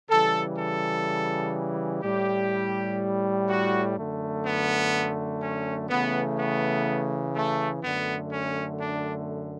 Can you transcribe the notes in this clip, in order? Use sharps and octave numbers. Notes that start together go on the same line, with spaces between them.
C#3 E3 G3 A4
A4
A2 G3 G4
F#4
F#2 D3 A3
B3
C#4
C#3 E3 A3 B3
B3
A3
F#2 D3 A3 B3
C#4
D4